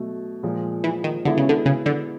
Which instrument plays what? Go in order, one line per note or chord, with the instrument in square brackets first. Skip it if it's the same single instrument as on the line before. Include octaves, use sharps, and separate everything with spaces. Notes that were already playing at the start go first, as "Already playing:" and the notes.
Already playing: [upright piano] B2 F#3 A3
A#2 F3 G#3
[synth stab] E3
D#3
[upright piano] B2 G#3 B3 E4 [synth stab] D3
[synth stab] C#3
D3
C#3
D3